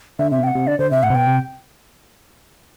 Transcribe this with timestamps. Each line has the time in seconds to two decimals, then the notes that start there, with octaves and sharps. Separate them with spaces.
0.19 D3 E5
0.31 C3 E5
0.39 B2
0.43 C3 G5
0.47 F#5
0.55 C3
0.67 D3 D5
0.79 D3 C5
0.91 C3 E5
1.03 A2 F#5
1.10 C3
1.15 B2 G5
1.27 C3